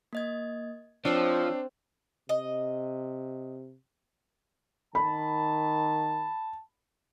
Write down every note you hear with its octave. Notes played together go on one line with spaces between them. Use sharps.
A#3 D#5 G#6
F3 C4 D4 C#5 E6 C7
C3 D#5
D#3 A5 B5